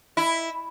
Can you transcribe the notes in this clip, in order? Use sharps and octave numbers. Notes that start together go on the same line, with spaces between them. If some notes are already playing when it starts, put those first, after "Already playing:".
E4